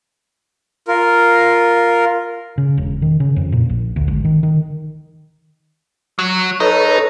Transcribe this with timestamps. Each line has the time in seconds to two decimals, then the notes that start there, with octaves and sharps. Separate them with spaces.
0.88 F4 A#4
2.58 C#3
2.78 E1
3.02 D#3
3.20 C#3
3.36 F2
3.52 A#2
3.69 A#1
3.96 D2
4.08 G#1
4.25 D#3
4.43 D#3
6.19 F#3
6.60 D#4 A4 B4 C#5